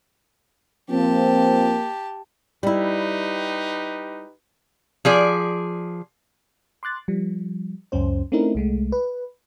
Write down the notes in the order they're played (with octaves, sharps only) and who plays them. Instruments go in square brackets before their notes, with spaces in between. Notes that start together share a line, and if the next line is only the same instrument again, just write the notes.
[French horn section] F3 C4 [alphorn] A#3 [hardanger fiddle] G4 A5
[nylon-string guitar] G3 E4 [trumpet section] D#4 G4 B4
[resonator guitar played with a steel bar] F3 G#4 D5
[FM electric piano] C6 D6 F#6 A6
F3 G3
C#2 F#2 C#4 C5
A3 C4 C#4 D#4 E4 A#4
C2 G#3 A3
B4